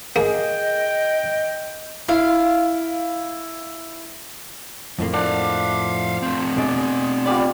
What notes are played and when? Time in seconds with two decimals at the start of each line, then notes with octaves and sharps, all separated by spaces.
0.16 A#3 G#4 D#5 G5
2.09 E4 F5
4.99 F2 A2 F3 A#3
5.14 D4 C5 F5 F#5
6.22 A3 C4
6.57 B2 G#3 D4
7.26 G3 B3 F4 D5